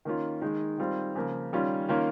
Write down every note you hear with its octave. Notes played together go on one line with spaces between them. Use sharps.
D#3 A#3 C#4 F4
D#3 G#3 D#4
D#3 G3 C4 F4
C#3 F3 A#3
D#3 G3 C#4 F4
D#3 A#3 C#4 F4